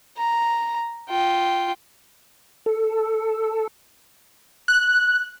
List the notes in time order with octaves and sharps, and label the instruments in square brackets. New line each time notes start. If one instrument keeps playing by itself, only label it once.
[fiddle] A#5
F4 G5
[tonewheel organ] A4
[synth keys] F#6